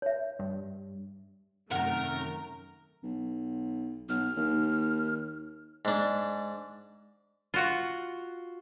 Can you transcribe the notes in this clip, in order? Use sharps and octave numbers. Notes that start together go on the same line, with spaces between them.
C#5 E5
G2
F#2 C3 D#3 A3 A#4 F#5 A#5
B1
B1 F6
D#2
G#2 D4
F4 F#4 F#5